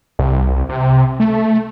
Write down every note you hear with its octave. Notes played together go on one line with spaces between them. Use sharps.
C2
C3
A3